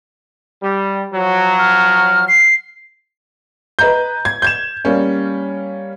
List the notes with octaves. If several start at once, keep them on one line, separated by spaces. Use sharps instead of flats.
G3
F3 F#3
F6
C7
B4 D#5 A#5 G6
G#6
G6 G#6 E7
G3 A#3 C#4